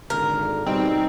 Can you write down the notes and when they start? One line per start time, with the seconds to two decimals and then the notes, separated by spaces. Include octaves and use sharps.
0.10 G#1 D3 A#4
0.66 B2 G3 C4 D#4